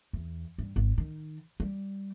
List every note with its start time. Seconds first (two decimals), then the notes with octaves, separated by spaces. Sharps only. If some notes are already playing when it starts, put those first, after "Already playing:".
0.13 E2
0.58 G2
0.76 G#1
0.98 D#3
1.60 G3